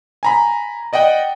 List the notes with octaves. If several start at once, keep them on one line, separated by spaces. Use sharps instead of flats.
G#5 A#5 B5
D5 D#5 F#5 G5